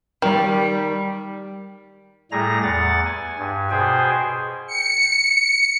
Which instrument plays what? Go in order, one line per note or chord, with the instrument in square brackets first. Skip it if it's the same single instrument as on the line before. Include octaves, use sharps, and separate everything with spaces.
[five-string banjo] D#3 [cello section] G3
[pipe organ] A2 G3 A3 G#4 A#5 A#6
E2 F#5 A6
G#5
G2
B2 G#4 C5 G5 G#5
[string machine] C#7